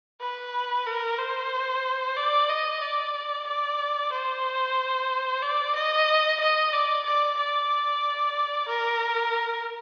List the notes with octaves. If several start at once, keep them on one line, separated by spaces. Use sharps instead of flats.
B4
A#4
C5
D5
D#5
D5
D5
C5
D5
D#5
D#5
D5
D5
D5
A#4